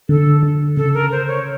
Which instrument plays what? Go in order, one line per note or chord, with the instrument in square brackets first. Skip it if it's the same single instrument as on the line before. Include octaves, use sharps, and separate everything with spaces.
[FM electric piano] D3 [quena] A4
[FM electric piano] D3
[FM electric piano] C#3 [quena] A4
[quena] A#4
C5
C#5